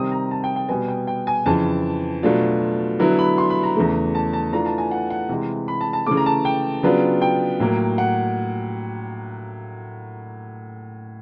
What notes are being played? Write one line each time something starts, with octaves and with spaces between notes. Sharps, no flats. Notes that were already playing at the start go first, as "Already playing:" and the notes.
Already playing: C3 D#3 G3 C4 D#6
A#5
A5
G5
G5
B2 G3 B3 G#5
G5
G5
G#5
F2 C#3 E3 A5
B2 F#3 A3 D4 F4
D3 F#3 B3 E4
B5
C6
B5
A#5
E2 C#3 E3 A3
A5
A5
E3 A3 D4 F4 A#5
A5
G#5
F#5
F#5
C3 E3 G#3
B5
A5
A5
C#3 E3 A3 D6
A#5
A5
G5
C#3 F#3 B3 D4 F4
G5
A2 F#3 A#3
F#5